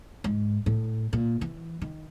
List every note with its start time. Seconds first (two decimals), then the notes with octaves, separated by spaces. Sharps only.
0.24 G#2
0.66 A2
1.13 A#2
1.41 E3
1.82 D#3